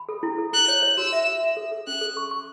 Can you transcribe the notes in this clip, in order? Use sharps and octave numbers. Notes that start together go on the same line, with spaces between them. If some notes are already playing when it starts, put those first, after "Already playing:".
Already playing: B5
A4
E4
A4
E4 F#6
C#5
C#5
F#4 E6
E5
F#4
E5
A4
A4
C#4 F#6
A4
C#6
C#6